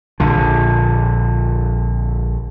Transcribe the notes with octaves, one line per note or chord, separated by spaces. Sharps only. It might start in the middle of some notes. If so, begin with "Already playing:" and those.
A#1 D3